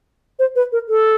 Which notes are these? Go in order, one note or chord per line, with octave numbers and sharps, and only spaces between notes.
C5
B4
A#4
A4